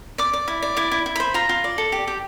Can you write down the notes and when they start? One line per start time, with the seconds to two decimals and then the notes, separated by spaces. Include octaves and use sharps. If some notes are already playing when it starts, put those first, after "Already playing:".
0.18 D5 D6
0.33 D5
0.48 E4
0.63 D5
0.77 E4 D6
0.92 E4
1.06 E4
1.16 C5 B5
1.34 F4 A#5
1.49 F4
1.64 D5
1.78 A4
1.92 G4
2.08 G4